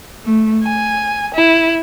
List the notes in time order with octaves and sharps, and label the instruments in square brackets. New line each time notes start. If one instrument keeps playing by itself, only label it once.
[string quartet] A3
G#5
E4